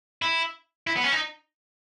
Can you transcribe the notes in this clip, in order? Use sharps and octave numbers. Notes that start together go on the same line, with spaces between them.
E4
E4
B3
C#4
D#4